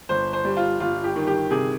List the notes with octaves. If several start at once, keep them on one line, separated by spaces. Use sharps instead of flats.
G1 C5
C5
G3
F4
G1 F4
G4
D#3
G4
C3 G#4